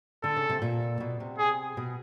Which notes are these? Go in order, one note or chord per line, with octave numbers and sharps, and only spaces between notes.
D3 A4
C#3
C3
A#2
B2
C3
G#4
B2